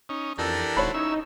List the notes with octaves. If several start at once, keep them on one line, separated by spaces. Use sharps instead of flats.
C#4 D#4
F2 E3 D4 G4 A4 A#4
D#1 A3 F#4 C5 C#5 B5
C#4 D#4 E4 E6